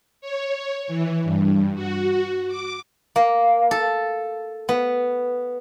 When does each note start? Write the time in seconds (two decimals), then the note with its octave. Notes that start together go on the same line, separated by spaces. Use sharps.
0.21 C#5
0.87 E3
1.24 G2
1.75 F#4
2.48 D6
3.16 A#3
3.71 A4
4.69 B3